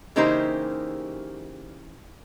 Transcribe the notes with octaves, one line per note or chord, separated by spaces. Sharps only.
C#3 E3 A#3 D#4 G4 C5